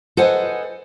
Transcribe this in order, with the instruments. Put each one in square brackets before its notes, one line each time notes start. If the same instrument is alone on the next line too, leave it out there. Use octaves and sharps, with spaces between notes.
[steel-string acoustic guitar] A4 B4 C5 D#5 F#5 G#5